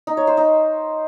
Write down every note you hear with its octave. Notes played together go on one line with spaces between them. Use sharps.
D#4
C#5
C5
D#4